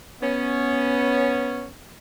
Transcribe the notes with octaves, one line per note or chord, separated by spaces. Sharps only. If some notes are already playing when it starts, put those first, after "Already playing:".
B3 C#4